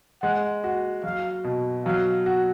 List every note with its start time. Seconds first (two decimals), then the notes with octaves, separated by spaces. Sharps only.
0.22 G#3 F#5
0.64 F#4
1.03 F#3 F5
1.44 B2
1.85 F#3 F5
2.26 F#4